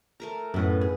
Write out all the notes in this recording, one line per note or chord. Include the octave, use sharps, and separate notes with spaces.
A3 A#4 A#5
F#2 A2 B3 B4 D#5
G#4